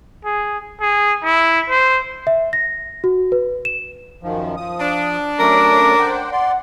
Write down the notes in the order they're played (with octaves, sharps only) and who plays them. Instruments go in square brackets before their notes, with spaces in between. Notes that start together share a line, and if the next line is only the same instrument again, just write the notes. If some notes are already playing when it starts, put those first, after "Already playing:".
[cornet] G#4
G#4
E4
C5
[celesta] E5
A#6
F#4
B4
E7
[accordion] F#2 D#3 F3
F3 D#6
[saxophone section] D4
[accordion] F#3 A3 C#4 [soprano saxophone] A#4 [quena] D6
[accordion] C5 F#5 G5
[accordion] D5 C6 [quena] F#5